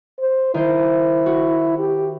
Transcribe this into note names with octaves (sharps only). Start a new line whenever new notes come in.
C5
D#3 E4 C5
F#4
G4